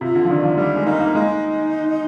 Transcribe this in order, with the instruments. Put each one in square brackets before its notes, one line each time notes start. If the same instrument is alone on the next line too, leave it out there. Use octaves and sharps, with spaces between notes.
[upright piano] C3 [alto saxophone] F4
[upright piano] D3
F3
[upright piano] D#3 [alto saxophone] D4
[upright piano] F3
[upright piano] G3 [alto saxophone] D4
[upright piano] G#3
[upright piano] A#3 [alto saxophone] D#4
[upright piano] A#3
[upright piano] G#3 [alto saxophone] D#4